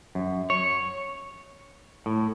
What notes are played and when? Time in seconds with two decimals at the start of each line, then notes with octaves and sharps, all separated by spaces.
0.15 F#2
0.50 C#5
2.06 A2